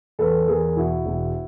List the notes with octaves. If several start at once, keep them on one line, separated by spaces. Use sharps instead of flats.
E2 A4 B4
E2 G#4 A#4
E1 E4 F#4
E1